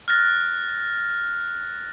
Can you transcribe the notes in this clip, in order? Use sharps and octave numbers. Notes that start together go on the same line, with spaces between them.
F6 F#6 A6 A#6